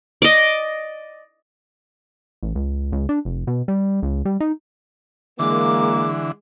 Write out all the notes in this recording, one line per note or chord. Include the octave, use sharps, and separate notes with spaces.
D5 D#5
A1
C#2
C#2
D4
F1
B2
G3
C#2
G3
D#4
D3 E3 G#3 A#3 D6